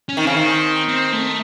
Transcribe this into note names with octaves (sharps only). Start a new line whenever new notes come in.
C#4
D#3 C4
C#3
D#3
C4
A3